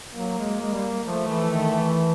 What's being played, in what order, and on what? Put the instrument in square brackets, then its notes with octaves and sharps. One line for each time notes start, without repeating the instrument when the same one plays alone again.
[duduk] F#3 [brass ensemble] A#3
[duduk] G#3
G#3
G3
[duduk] F3 [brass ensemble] A3
[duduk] E3
D#3
E3